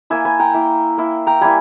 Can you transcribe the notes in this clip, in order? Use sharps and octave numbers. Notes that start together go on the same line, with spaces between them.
A#3 E4 E5 G#5
G#5 B5
G5 A#5
A#3 E4
A#3 E4
G5 A#5
G3 A#3 E4 G#5 B5